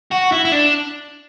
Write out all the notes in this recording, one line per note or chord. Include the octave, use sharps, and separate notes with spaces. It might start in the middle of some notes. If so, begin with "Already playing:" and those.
F#4
E4
E4
D4